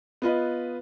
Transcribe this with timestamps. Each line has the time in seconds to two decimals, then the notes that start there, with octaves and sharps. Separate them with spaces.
0.22 B3 F4 B4 D#5